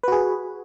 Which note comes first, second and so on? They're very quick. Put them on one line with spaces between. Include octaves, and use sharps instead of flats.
B4 F#4 G#4